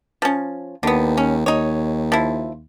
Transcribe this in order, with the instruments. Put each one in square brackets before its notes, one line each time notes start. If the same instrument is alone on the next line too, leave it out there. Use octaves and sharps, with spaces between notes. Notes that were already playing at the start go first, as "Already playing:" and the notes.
[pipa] F3 C#4
[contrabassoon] D#2 [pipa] D3 B3
[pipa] C#4
[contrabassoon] D#2 [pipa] D#4 C#5
[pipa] F3 E4